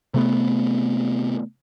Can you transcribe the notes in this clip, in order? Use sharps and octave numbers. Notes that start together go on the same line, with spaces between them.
C3 A3 B3